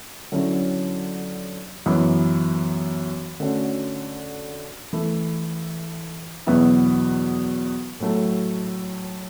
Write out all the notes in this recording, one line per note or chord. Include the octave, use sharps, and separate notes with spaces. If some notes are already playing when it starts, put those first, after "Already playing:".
D3 F#3 C#4 E4
F#2 E3 B3
D3 A3 C#4 F#4
E3 A3 E4
E2 B2 F#3 B3 E4
A2 F#3 A3